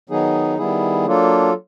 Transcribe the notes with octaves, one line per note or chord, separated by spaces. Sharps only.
D#3 F#3 B3 D#4 G#4
D#3 G3 B3 E4 G#4
F#3 A#3 D4 F4 A4